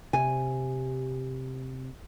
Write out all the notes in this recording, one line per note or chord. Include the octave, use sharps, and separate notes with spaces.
C3 G#5